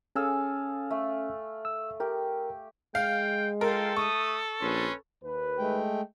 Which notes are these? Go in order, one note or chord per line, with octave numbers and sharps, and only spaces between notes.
C#4 G#4 A4 F5 E6
A3
E6
G4 A#4
G#3 F5 G5
F4 A4 A#4 G5 C6
A3 C#6 D#6
A#1 C#4 B4 C6
D#2 B4
G#3 A3 G5